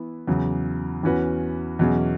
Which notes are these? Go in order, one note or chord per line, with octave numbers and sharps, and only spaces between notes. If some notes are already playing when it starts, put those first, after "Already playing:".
Already playing: E3 B3 E4
E2 C#3 F#3
E2 E3 C#4 F#4 B4
E2 B2 F#3 C#4 G#4